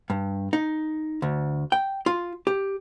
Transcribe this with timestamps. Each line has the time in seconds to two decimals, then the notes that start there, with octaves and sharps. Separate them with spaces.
0.10 G2
0.53 D#4
1.22 D2
1.72 G5
2.06 F4
2.47 G4